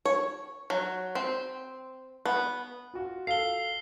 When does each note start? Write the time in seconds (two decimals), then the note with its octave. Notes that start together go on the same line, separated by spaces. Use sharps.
0.06 C#5
0.70 F#3
1.15 C4
2.26 B3
2.94 F4 F#4
3.27 A4 F5 C7 G7